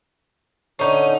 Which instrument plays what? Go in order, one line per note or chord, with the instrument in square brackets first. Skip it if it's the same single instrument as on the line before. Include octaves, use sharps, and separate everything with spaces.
[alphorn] D3 [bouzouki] C#4 D#4